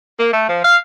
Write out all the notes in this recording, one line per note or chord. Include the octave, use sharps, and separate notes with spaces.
A#3
A3
F3
F5